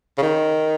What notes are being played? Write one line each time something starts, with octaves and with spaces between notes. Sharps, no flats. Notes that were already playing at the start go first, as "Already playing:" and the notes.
C#3
D#3